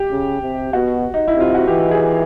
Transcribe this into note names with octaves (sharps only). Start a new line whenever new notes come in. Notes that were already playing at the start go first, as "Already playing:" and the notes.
Already playing: G4
C#3
C3
B2 F#4
D#4
E4
C3 F4
F#4
E3 G4
G#4